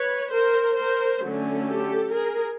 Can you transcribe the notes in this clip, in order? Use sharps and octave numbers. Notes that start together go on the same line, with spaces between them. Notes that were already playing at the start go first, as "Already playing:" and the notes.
Already playing: B4 C#5
A#4 C5
A#4 C5
D3 F#3 A3 C#4
G4 A4
G#4 A#4